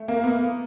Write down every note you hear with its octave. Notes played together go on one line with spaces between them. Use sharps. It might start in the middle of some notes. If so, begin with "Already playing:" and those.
Already playing: A3
A#3
B3